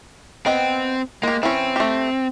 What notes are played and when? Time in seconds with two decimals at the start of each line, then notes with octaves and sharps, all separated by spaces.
0.46 B3 C4 D#5 G5
1.23 G#3 A#3 G4
1.43 E3 C4 C#4
1.76 A3 G4